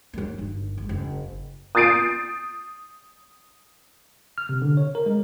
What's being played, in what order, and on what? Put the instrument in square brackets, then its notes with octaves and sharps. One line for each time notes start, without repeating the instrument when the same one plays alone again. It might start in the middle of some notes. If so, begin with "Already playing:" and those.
[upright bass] F#3 A#3
G1 D#3
G#2
F#1
[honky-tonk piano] D#6 G6 A6 C7 D7 D#7
[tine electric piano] F6
C3
D3
C#5
A#4
G#3